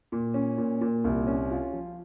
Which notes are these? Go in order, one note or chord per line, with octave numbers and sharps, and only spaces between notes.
A#2
C#4
A#2
A#2
C2
C#4
F4
F3